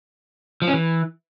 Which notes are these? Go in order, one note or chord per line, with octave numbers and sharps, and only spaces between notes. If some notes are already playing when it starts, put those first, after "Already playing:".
F3
C#4
E3